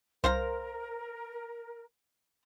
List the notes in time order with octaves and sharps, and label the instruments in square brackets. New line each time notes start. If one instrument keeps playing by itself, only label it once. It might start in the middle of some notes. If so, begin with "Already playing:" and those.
[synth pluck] C2 [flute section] A#4 [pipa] C5 F5 A#5